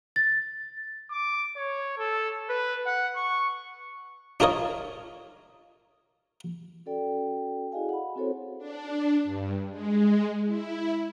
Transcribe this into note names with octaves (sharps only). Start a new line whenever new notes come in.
A6
D6
C#5
A4
B4
F#5
C#6
D4 F4 A#4 C#5 D#5
C#4 F#4 A4 D5 G5
E4 F#4 G#4 D#5 F5 G#5
F#5 B5
C4 E4 F#4 A4 C5 C#5
D4
G2
G#3
E4